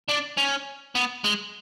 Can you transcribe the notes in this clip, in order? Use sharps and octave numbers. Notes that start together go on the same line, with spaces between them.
D4
C#4
B3
G#3